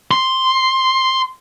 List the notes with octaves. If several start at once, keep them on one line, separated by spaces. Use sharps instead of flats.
C6